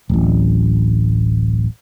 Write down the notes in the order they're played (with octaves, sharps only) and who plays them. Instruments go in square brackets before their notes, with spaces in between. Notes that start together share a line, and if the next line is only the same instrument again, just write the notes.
[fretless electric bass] D1 A1